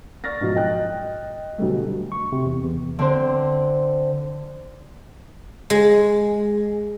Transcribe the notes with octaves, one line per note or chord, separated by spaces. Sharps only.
D5 C#6 F6 A6 A#6
G#2 B2 F3 F#3
D#5 G5 F#6
D2 B2 F#3 G3 A3
C#6
C3
E2
E2
D3 C4 C5
G#3